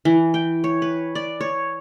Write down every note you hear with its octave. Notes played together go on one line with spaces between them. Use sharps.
E3
G5
C#5
B4
D5
C#5